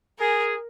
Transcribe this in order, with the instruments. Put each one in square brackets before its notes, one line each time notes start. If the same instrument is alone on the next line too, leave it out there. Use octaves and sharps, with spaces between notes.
[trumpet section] G#4 [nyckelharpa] A#4